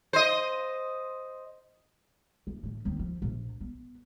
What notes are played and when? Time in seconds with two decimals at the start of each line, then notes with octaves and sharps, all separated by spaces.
0.13 C5 D#5
2.47 D2
2.63 A2 E3
2.85 D#2 C4
2.99 F3
3.22 A#1
3.61 B3